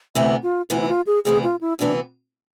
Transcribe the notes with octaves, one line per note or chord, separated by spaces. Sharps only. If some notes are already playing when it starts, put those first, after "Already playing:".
D2 C3 E3 B3 E5
F4
D2 C3 E3 B3 E4
E4
F4
G#4
D2 C3 E3 B3 G#4
F4
E4
D2 C3 E3 B3 D4